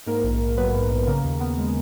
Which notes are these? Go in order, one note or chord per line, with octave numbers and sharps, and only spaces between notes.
G#2 A#3 A#4
A#1
A#1
F#3 B3 B4
G#2
A#1
C#3 A#3 A#4
D#2
B3
G#3